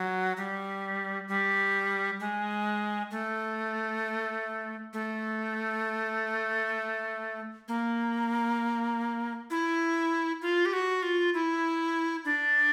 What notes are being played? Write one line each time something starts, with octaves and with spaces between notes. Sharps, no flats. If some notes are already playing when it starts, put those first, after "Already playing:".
Already playing: F#3
G3
G3
G#3
A3
A3
A#3
E4
F4
G4
F#4
F4
E4
D4